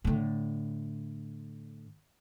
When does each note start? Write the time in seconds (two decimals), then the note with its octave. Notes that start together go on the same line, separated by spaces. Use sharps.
0.04 A2 D3